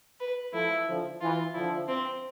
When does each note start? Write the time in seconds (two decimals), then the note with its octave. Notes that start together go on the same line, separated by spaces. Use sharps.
0.20 B4
0.54 F3 A3 E4
0.87 D3 F3
1.21 E3 F4
1.55 D3 F3 E4
1.88 C4